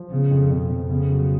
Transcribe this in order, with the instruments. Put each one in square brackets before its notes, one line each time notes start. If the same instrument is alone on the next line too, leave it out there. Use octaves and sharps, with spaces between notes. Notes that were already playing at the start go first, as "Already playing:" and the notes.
Already playing: [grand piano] F3
[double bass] C#3 [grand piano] B3
[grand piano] F2
[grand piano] F2 [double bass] B2
[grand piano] F2
[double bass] C#3 [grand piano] B3
[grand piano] F#3